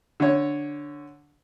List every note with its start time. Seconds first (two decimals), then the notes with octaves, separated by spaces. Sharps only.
0.20 D3 C#5